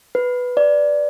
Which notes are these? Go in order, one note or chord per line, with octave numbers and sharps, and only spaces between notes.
B4
D5